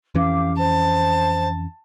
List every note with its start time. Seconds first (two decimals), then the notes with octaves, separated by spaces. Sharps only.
0.15 F2 E3 C#4 G4 F5 D6
0.58 C5 A5